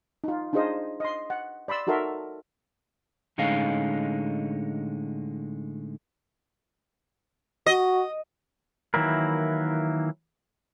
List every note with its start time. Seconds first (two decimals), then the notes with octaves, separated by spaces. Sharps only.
0.24 D#4 F4
0.53 D4 D#4 F4 G#4 C5 D#5
1.00 D#5 C6
1.30 F#5
1.68 D5 B5 C6 E6
1.87 D#4 F#4 A4 A#4 E5 C6
3.38 A2 D3 G#3 C#4 D#4 F5
7.66 F#4 D#5
8.94 D#3 E3 F#3 A#3 E4 A#4